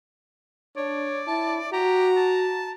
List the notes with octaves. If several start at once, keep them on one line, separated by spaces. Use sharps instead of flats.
D4 C#5 D5
E4 A5
F#4 G4 A#5
A5